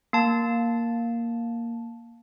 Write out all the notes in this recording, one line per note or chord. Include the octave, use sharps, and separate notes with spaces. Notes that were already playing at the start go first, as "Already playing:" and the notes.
A#3 A5